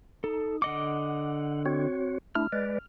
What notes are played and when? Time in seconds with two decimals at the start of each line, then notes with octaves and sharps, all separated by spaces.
0.24 D#4 A4
0.62 D3 D#5 F#5 D6
1.65 C4 F#4 C#5
2.35 A3 D4 E4 F6
2.53 G#3 B4 D5